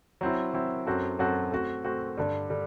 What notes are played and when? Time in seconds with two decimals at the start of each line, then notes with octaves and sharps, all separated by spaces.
0.21 F#3 C4 E4
0.54 F#3 C4 E4
0.86 F#2 F#3 C4 F#4 A4
1.19 F#2 F#3 C4 F#4 A4
1.52 A3 C4 F#4
1.84 A3 C4 F#4
2.17 G2 D3 G3
2.50 D3 G3